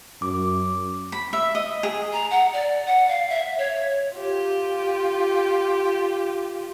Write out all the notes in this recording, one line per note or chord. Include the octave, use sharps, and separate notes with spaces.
F#2 D6
B5
E5
D#5
G#4
A#5
F#5
D5
F#5
F5
E5
C#5
F4 G4